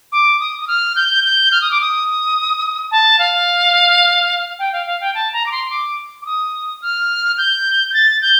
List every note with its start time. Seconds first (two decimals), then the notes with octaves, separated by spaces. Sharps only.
0.12 D6
0.40 D#6
0.61 D#6
0.68 F6
0.96 G6
1.24 G6
1.52 F6
1.61 D#6
1.71 D6
1.81 D#6
2.91 A5
3.19 F5
4.59 G5
4.73 F5
4.87 F5
5.01 G5
5.15 A5
5.33 A#5
5.46 D6
5.52 C6
5.70 D6
6.22 D6
6.26 D#6
6.82 F6
7.38 G6
7.90 G6
7.94 A6
8.22 G6